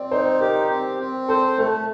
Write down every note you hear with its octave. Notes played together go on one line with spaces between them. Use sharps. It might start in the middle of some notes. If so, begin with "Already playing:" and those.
Already playing: C4 D5
D#4 C5
G4 A#4
C4
C4
A4 C5
A3 A4